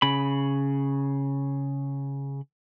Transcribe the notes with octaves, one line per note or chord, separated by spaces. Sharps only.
C#3 B5